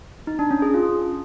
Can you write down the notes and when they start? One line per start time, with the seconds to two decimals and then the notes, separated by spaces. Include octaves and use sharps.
0.27 D#4
0.39 D4
0.51 C#4
0.62 G#4
0.74 F4